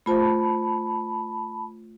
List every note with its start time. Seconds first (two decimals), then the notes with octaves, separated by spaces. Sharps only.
0.06 A3 F4 C5 A5 B5